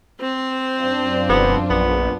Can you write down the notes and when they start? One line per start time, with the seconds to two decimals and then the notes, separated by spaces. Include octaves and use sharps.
0.21 C4 C5
0.80 F#2 D4 F4
1.29 E1 B3
1.70 A#1 B3